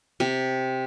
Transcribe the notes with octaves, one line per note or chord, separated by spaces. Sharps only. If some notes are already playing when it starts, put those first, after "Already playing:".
C3